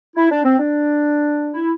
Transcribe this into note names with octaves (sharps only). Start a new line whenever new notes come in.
E4
D4
C4
D4
E4